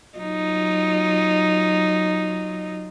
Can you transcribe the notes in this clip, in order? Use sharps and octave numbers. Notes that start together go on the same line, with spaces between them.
F#3 D#4 F4